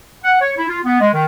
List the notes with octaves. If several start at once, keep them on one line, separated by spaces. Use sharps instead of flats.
F#5
C#5
E4
F4
B3
G#3
D#3